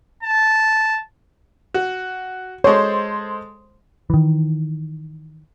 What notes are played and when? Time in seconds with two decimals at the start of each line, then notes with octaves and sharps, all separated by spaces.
0.23 A5
1.74 F#4
2.64 G#3 A4 C5 C#5
4.10 D#3 E3